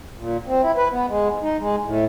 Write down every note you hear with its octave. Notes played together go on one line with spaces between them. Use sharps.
A#2
C4
E4
B4
B3
G#3
G#2
D#4
G#3
A2